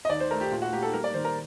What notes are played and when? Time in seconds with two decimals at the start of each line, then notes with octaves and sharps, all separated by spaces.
0.05 D#5
0.09 D#2 D5
0.20 C5
0.31 A3 A#4
0.41 G4
0.51 A#2
0.62 F#4
0.73 A#3 G4
0.83 A4
0.93 G3 A#4
1.04 D5
1.14 D#3 C5
1.25 A#4